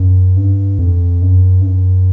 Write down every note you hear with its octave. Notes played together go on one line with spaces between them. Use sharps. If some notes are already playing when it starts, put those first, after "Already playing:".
Already playing: F#2
G2
F2
F#2
G2
F#2